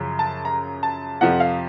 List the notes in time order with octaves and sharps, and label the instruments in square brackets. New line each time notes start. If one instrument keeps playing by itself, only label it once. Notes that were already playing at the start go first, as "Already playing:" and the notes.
Already playing: [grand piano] F#2 C#3 F3
A5
A#5
A5
F2 C3 F3 F#5
F5